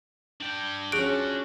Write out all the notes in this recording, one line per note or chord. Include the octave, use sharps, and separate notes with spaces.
D4 G5
F3 C#4 F#4 G#4 F#6 D7